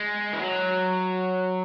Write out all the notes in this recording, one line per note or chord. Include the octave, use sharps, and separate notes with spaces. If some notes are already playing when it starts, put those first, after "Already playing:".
Already playing: G#3
E3
F#3